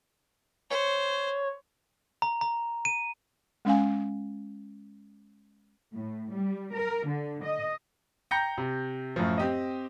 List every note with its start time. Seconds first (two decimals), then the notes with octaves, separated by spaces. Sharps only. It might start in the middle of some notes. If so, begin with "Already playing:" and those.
0.70 C5 C#5
2.22 A#5
2.41 A#5
2.85 D#7
3.65 G#3 C#4 F5 G#5
5.93 A2
6.30 G3
6.74 A#4
7.06 D3
7.44 D#5
8.31 G5 A#5 G6 A#6 C#7
8.58 C3
9.16 F#2 A2 F3
9.37 C4 G4 D#5